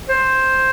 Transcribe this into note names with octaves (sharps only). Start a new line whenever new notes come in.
C5